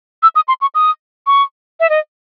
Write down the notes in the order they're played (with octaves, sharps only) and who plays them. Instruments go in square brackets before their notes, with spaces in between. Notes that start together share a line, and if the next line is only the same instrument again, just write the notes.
[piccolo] E6
D#6
C6
C#6
D#6
C#6
E5
D#5